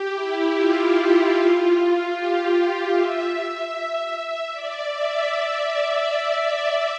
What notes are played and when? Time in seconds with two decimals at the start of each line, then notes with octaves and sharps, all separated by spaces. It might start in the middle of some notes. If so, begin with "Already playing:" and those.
Already playing: G4
0.13 E4
0.53 F4
2.13 G4
2.92 E5
4.52 D5
4.92 E5